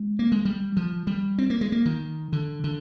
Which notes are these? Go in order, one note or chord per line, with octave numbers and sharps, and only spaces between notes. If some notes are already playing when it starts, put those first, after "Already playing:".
Already playing: G#3
A#3
G#3
G3
F3
G3
C4
A#3
G#3
A#3
D#3
D3
D3